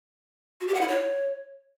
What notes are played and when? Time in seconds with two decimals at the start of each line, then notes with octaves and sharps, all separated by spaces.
0.61 F#4
0.67 G4
0.74 F#5
0.81 E4
0.88 C#5